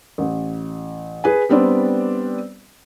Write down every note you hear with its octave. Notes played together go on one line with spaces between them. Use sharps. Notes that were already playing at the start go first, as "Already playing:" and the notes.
A1
G#4 B4 G#5
G3 B3 C4 D4 D5